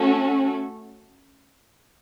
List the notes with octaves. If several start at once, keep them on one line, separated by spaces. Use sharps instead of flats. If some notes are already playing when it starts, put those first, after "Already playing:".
Already playing: A3 C#4 F#4 A4